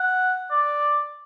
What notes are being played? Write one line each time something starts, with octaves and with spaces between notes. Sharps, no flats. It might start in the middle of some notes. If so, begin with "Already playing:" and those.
Already playing: F#5
D5